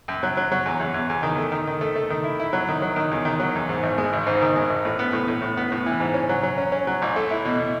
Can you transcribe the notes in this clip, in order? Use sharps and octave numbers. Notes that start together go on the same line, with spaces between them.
F#2
F#3
F#3
F#3
E2
E2
E2
E2
D#3
A3
D#3
D#3
A3
A3
D#3
E4
E4
F#3
D#3
F#3
D#3
E2
D#3
F#3
E2
G#2
G#1
G#3
G#1
G#2
D#3
G#3
G#1
A2
B3
A2
A2
A2
B3
A2
E3
G#2
C#4
F#3
F#3
C#4
C#4
F#3
A1
A3
E4
B2
B2